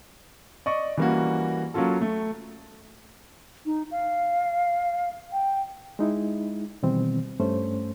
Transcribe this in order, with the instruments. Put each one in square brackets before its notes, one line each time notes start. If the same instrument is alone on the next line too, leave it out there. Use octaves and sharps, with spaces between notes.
[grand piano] D5 D#5 C#6
E3 G3 A#3 C#4 F#4
F#3 A#3 C#4 F4 A4
A3
[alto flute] D#4
F5
G5
[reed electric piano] G#3 D#4 E4
B2 D#3 E3 G3 C4
G2 A3 C#4 C5